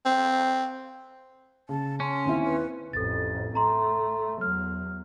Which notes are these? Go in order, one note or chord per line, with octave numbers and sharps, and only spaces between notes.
C4
C#3 A5
C#4 C6
D#2 C4 E4
B4
A1 F2 A4 A6
A3 A#5 C6
E2 F#3 F6